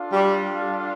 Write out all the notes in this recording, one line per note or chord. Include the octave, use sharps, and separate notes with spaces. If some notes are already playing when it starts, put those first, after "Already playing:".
Already playing: D4 F4 A4 F5
G3